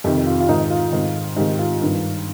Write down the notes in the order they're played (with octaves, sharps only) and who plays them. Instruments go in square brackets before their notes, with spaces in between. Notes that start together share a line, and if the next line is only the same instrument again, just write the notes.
[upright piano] F2 C3 D#3 G4
F4
F4
G#2 D#3 D#4
F4
G#2 D#3
G#2 D#3 G4
F4
G2 D#3